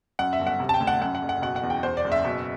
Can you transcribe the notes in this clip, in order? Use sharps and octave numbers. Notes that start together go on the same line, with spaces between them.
F#2 F#5
E5
G1
F#5
C3
A5
G5
D2
F#5
F#2 F#5
F#5
F#1
F#5
B2 F#5
F#5
E2
G5
E2 C5
D5
F#1
E5
B2